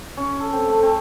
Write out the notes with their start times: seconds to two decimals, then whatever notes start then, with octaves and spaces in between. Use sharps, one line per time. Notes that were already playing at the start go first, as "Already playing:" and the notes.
0.17 C#4
0.40 A4
0.53 C4
0.68 A3
0.83 C4